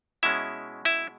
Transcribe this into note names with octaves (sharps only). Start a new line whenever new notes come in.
B2 G#3 C#4 E4 E5
E4 E5